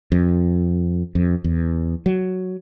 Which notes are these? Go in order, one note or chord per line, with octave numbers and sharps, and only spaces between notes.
F2
F2
E2
F#3